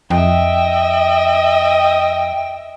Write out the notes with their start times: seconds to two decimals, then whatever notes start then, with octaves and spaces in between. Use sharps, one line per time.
0.10 F2 D#5 E5 G5